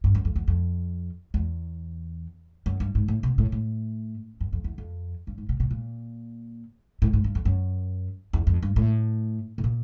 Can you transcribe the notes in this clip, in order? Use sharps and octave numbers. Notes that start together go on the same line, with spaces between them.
G2
F#2
F2
E2
F2
E2
F#2
G2
G#2
A2
B2
A2
A2
F#2
F2
E2
F2
G2
G#2
B2
B2
A#2
A2
G#2
G2
F2
F#2
E2
F2
G2
A2
A2
A#2